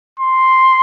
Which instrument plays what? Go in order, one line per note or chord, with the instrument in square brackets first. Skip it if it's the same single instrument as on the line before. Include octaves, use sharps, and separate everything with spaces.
[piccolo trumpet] C6